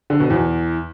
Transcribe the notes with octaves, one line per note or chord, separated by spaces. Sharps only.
D3
B2
E2